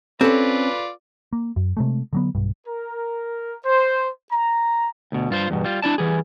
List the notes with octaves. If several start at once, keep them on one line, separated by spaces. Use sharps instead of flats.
C4 C#4 F4 A4 B4 D5
A#3
F#2
C3 G#3 A3
D3 F#3 B3
B1 G2
A#4
C5
A#5
D2 B2
G2 F4 C5
E2 G2 B2
G3 F4
D4 E4 D5 A5
E3 G3 G#4